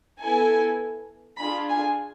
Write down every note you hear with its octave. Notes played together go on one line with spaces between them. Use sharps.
B3 E4 A4 G#5
D4 F4 G#4 B5
G#5